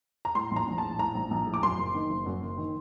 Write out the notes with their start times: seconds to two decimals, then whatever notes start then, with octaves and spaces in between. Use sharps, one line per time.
0.25 A#5
0.35 A2 C6
0.51 A#1
0.56 A#5
0.67 A#1
0.78 A2 A5
0.99 A2 A#5
1.15 A#1
1.31 A#1
1.47 A2
1.54 D6
1.62 F#2 C6
1.78 F#1
1.94 D#3
2.10 F#1
2.26 F#2
2.42 F#1
2.58 D#3